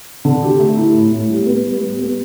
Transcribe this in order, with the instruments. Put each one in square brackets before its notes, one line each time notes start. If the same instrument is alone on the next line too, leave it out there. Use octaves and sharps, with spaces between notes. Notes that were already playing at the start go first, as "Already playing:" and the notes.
[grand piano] D3
G4
A3
E4
A2
A2
G3
B3
G3
G3
B3